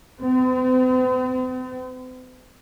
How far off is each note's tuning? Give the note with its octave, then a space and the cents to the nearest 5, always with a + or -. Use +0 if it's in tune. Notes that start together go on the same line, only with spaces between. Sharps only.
C4 -45